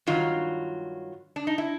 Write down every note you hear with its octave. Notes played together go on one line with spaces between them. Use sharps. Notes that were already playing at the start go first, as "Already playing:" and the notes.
G2 D#3 F#3 F4
D4
D#4
E4